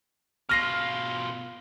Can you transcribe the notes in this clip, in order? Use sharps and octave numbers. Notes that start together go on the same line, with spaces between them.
B2 F4 F6 A#6 C7